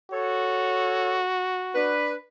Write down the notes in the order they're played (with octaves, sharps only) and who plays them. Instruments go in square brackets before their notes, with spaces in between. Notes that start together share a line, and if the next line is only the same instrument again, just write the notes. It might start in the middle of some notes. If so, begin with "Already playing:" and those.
[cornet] F#4 [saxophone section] A4 C#5
[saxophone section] D4 B4